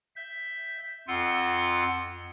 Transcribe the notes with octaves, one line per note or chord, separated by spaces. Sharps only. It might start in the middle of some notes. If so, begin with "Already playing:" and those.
E5 G6
F2 F4 F#5 C6 E6